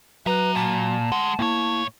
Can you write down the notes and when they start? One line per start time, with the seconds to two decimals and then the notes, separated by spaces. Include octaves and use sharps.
0.26 F#3 B4 E5 A#5
0.55 A#2 A5
1.12 D2 G#3 F#5
1.39 A2 A#3 E4 C#5